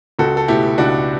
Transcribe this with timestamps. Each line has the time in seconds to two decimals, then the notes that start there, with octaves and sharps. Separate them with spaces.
0.19 C#2 F#4 A4
0.37 A4
0.48 B2 A3 E4 G4
0.78 C#2 D4 F#4